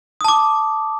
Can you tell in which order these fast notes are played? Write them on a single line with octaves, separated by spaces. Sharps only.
D#6 A5 D6